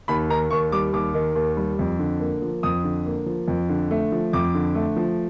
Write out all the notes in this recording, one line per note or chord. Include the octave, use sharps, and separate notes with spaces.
D#2 B5
D#3 A#5
D#2 C#6
G3 D6
D#2 D6
D#3
D#2
G3
F2
D3
A#3
F3
F2 D#6
D3
A#3
F3
F2
D3
A3
F3
F2 D6
D3
A3
F3